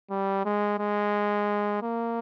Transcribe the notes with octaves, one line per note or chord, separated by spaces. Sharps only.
G3
G#3
G#3
A#3